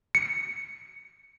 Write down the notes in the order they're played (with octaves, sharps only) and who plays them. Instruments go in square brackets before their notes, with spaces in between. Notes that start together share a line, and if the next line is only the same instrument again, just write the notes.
[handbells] C#7